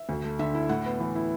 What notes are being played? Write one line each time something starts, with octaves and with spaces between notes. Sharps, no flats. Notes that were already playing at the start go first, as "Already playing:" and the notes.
Already playing: E5
D2
A3
D3 E5
E4
A2 F#5
B3
E3
E4